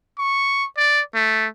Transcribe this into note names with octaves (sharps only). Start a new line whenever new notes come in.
C#6
D5
A3